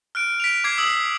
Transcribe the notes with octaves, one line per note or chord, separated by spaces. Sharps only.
F6 F#6 D7
B6 D7 F7
D6 G#6 C7
D#6 E6 G#6 C7 F#7